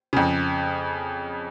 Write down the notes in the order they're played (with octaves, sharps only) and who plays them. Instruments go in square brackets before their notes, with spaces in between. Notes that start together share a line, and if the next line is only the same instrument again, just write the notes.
[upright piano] F2 C#3